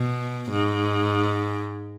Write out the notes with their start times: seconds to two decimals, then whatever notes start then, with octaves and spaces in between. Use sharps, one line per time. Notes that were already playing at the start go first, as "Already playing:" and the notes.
Already playing: B2
0.51 G#2